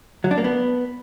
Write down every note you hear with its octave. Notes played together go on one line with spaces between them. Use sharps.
F#3
D4
A#3
B3